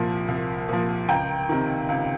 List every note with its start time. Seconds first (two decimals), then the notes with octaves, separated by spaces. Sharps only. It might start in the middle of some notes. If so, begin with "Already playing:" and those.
Already playing: C2 A#2 F3
0.28 C2
0.69 A#2 F3
1.08 C#2 G5 A#5
1.49 C3 D#3
1.89 C#2